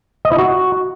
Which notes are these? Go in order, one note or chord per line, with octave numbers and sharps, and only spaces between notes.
D#5
E4
F#4